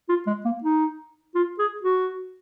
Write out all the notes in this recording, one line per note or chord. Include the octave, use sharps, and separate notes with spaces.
F4
G#3
A#3
D#4
F4
G#4
F#4